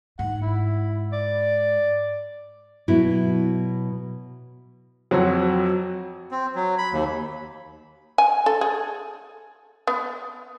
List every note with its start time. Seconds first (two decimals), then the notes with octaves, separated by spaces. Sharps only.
0.19 G#2 F#5
0.42 E4
1.13 D5
2.88 B2 F#3 E4
5.11 F2 F#3 C4 F#4 C#5
6.31 C4
6.55 F#3
6.78 B5
6.92 D#2
8.18 G#5
8.46 A4
8.61 G#4
9.87 B3